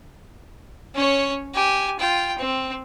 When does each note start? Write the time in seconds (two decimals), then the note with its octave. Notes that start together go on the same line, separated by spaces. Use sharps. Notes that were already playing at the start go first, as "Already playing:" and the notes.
0.94 C#4 C#5
1.54 G4 G#5
1.99 F4 G5
2.38 C4